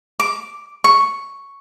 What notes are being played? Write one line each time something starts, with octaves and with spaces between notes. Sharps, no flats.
D6
C#6